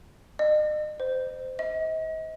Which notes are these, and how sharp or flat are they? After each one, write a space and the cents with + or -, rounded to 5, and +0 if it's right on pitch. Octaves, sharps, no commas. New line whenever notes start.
D#5 -40
C5 -15
D#5 +40